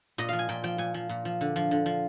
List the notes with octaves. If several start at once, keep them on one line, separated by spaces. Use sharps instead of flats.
A#2 D#5
F3 F5
G#5
A#2 G5
F3 G5
A#2 G#5
F3
A#2
F3
D3
F3
D3
F3